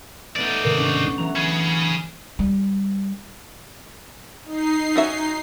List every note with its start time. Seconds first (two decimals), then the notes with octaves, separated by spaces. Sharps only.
0.36 A3 B3 D#4 D5
0.64 G#2 C3 D#3
0.77 C#4 D4
1.18 E3 F#3 A#5
1.36 C#4 G#4 B5
2.39 G3
4.45 D#4 C7
4.96 C#4 F#4 E5